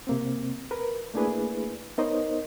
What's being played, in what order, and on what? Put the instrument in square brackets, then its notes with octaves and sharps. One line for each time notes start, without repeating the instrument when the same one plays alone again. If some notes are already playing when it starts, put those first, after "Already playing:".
[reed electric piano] C3 A#3 C4
A#4 B4
A3 A#3 D4 E4 G#4 B4
B3 D#4 A#4 C5 C#5 D#5